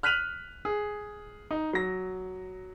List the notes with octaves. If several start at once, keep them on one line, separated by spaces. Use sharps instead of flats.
F6 F#6 B6 D#7 F7 F#7
G#4
D#4
F#3 A#6